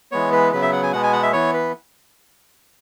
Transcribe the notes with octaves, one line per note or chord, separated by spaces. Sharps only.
E3 G#3 B3 C#5
B4
C#3 F#3 B3 B4
E5
F#5
G#5
B2 G#3 B3 F#5
G#5
F#5
E5
E3 B3 C#5
B4